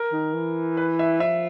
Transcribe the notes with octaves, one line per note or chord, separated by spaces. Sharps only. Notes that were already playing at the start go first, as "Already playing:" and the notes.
Already playing: A#4
D#3
E3
B4
E5
F3 E5